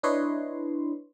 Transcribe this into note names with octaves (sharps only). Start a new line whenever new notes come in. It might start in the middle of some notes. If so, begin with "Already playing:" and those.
D4 E4 B4 C#5 D#5 C6